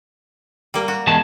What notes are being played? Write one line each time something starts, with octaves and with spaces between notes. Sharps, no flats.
G3 A#3
F#4
E2 G#3 A5